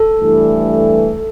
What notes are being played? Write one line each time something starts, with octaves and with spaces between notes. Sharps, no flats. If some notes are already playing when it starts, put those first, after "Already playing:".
Already playing: A4
G2 E3 A3